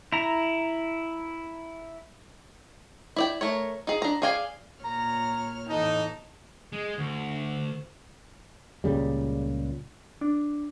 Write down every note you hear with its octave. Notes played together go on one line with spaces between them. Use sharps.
E4 A#5
E4 D5 G5
A3 A#4 C#5
D#4 G#4
D4 A#5
G#4 D5 F5 G5 G#5
A#2 C#5 A#5 F6
F2 A2 E3 D#4 A5
G#3
D2
C#2 A#2 C#3 G3
D4